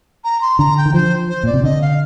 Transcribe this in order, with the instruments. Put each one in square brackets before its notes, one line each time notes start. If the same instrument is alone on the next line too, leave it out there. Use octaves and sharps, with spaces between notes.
[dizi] A#5
C6
[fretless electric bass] D3 [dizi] A#5
[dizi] G5
[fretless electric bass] D#3
[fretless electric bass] F3 [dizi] C5
[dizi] C5
[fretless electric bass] A#2 [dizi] D5
[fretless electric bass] C3
[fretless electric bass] D3 [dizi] D#5
[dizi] F5